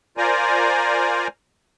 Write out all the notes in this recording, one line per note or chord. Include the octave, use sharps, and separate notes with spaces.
F4 A#4 C5 D5 G#5 A#5